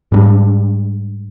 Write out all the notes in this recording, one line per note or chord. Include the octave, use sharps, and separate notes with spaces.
G#2 G3 A#3 D4